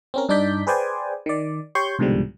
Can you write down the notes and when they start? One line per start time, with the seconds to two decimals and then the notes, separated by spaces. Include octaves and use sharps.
0.14 C4 C#4 A#4
0.29 G2 D4 D#4 D5 G6 B6
0.67 G#4 B4 C5 D5 G5 G#5
1.26 D#3 D5
1.75 G4 C#5 C6 C#6 G6
1.99 C2 G#2 B2 D3 F3 G3